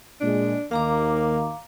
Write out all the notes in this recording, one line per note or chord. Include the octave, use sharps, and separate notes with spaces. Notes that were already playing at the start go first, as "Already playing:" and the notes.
A#2 G#3 D4
D#2 D#3 A#3 F5 A#5 D6